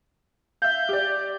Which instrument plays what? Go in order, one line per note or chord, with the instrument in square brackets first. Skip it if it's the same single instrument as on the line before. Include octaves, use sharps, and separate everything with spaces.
[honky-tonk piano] E5 F5 [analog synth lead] G6
[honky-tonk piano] G4 D5